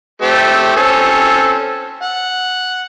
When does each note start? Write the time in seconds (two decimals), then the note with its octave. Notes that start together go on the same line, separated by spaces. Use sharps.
0.22 A3 C4 G4
0.76 C4 C#4 A4
2.02 F#5